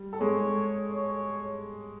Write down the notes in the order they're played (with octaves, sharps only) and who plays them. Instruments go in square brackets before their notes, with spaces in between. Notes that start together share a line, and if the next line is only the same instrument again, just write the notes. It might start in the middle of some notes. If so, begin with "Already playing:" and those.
Already playing: [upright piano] G3
A4
[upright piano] G#3 G#4 [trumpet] C#5
[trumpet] C#5